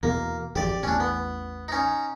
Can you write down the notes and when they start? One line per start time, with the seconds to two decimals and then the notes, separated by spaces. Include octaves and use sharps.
0.03 E2 B2 A#3
0.56 G#1 F2 G4 D5
0.83 A1 E2 C#4 D4
1.00 B3
1.68 C#4 D#4